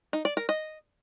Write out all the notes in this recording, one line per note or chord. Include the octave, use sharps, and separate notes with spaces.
D#4
D5
A#4
D#5